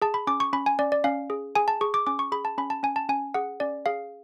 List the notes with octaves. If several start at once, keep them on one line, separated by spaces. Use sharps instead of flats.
G#4 A5
B5
C#4 D6
C#6
C#4 B5
G#5
C#4 D5
D5
C#4 F5
G#4
G#4 G#5
A5
G#4 C#6
D6
C#4 D6
C#6
G#4 B5
A5
C#4 B5
A5
C#4 G#5
A5
C#4 G#5
G#4 F#5
C#4 D5
G#4 F5